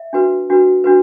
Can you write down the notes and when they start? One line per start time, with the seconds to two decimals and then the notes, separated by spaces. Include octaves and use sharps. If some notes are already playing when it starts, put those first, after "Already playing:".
Already playing: E5
0.13 D4 F#4 B4
0.50 D4 F#4 B4
0.84 D4 F#4 B4